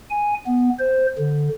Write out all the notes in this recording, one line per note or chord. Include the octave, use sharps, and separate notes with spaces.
G#5
B3
C5
D3